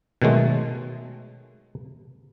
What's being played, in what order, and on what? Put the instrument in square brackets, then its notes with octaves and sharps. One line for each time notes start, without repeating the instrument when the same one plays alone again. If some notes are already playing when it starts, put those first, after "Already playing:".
[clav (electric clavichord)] B2 D#3 F#3 G#3 A3